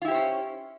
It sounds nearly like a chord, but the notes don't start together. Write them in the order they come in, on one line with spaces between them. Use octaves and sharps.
F4 E4 G4 C5 C#4